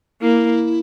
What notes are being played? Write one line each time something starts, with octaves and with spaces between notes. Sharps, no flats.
A#3 E4